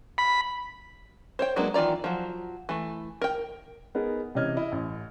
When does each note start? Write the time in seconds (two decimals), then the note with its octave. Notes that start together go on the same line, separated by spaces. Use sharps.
0.18 B5
1.39 C5 C#5 G5
1.56 F#3 G#3 A#3 B3 D4
1.74 D#3 E3 F4 D5 A#5
2.04 F3 F#3
2.69 E3 A3
3.22 A#4 G5
3.95 B3 D#4 G#4 A#4
4.35 C3 E3 C#4 D#5 F6 G#6
4.57 E4 D#5
4.72 A1